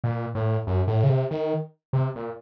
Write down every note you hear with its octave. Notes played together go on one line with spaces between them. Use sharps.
A#2
A2
F#2
A2
C#3
C3
D#3
C3
A#2